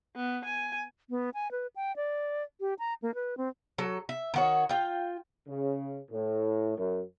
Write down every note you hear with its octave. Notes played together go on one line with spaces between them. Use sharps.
B3
G#5
B3
G#5
B4
G5
D5
G4
A#5
A#3
B4
C4
F#3 A4
E5
D#3 F#4 C#5
F4 G5
C#3
A2
F#2